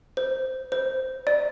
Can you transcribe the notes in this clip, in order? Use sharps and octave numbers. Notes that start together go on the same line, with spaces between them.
C5
C5
D5